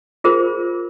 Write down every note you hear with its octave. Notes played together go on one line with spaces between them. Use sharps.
F4 G#4 A#4 C5